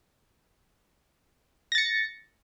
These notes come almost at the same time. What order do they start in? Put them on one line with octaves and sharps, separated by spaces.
A#6 A6 C#7